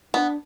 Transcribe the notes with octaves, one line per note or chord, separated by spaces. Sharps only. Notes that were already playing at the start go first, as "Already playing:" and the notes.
B3 D4